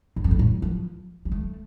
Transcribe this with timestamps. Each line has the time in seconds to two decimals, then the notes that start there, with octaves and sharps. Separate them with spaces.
0.16 G2
0.24 F2
0.31 G2
0.39 A2
0.62 F3
1.25 G3
1.32 A3